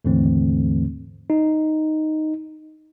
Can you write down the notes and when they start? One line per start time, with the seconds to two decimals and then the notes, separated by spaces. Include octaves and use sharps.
0.05 D#2 G#2 D3 E3 A3 C4
1.30 D#4